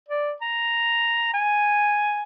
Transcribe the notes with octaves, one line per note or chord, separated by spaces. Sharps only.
D5
A#5
G#5